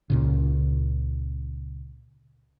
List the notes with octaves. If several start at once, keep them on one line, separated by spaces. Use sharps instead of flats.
C#2 A#2 C#3